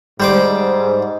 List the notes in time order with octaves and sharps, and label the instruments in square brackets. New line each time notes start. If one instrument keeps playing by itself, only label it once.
[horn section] G#2 [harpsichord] G3 C5 D6